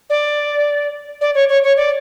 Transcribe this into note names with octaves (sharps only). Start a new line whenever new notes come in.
D5
D5
C#5
C#5
C#5
D5